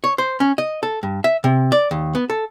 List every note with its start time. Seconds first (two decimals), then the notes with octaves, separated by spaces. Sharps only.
0.04 C#5
0.18 C5
0.40 C#4
0.58 D#5
0.83 A4
1.03 G2
1.24 E5
1.44 C3
1.72 D5
1.91 D#2
2.15 B3
2.30 A4